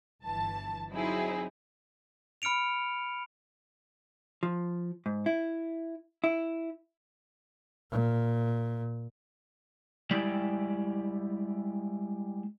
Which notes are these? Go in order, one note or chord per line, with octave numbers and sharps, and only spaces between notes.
G1 E3 A5
F#3 C4 D#4 E4 G#4
B5 F6 C#7 D7 F7
F3
G#2
E4
E4
A#2
G3 G#3 E4 G4 D5